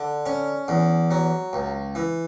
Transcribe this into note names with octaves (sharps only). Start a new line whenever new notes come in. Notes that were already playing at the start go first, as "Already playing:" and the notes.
Already playing: D3
C#4
E2
F#3
C#2
E3